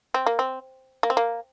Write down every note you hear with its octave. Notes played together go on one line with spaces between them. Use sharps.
C4
A#3
C4
A#3
C4
A#3